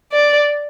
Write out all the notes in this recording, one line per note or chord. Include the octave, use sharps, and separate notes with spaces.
D5